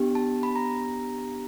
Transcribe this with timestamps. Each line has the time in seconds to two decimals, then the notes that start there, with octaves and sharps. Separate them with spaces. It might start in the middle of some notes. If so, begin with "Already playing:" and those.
Already playing: B3 D4 G4
0.15 A5
0.43 B5
0.56 A#5